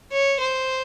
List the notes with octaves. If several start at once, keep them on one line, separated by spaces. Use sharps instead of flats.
C#5
C5